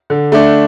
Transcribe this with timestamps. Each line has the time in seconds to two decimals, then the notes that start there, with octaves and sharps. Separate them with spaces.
0.10 D3
0.32 A3 D4